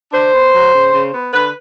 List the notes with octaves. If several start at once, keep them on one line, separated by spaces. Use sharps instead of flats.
D4 C5
B3
F#3
C#3
C#3
B3
D3 B4